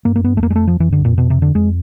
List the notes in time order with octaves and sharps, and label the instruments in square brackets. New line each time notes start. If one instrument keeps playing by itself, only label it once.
[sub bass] G2 [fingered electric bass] A#3
[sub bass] F#2 [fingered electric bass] A#3
[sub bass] G2 [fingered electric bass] B3
[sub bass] E2 [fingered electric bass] A3
[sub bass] F2 [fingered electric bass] A#3
[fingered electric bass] G#3
A3
F3
[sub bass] F2 [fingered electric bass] E3
[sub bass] F#2 [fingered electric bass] D3
[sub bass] F2 [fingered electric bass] A#2
[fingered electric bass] B2
C3
D3
[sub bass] F2 [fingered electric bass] G#3